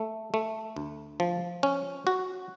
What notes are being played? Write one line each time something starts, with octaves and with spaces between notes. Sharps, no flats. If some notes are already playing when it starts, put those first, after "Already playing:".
Already playing: A3
A3
D2
F3
C#4
F#4